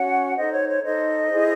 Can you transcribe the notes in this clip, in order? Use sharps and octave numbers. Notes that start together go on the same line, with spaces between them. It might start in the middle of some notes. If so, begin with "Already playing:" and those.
Already playing: C#4 F#4 C#5 F#5
D#4 A4 C5 D#5
C#5
C#5
D#4 A4 C5 D#5
E4 G#4 C5